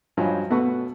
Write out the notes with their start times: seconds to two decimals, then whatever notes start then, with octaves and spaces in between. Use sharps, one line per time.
0.17 G2 F3 F#3 D#5 F5 G#5
0.50 B2 A3 B3 F#4 F#5 C#6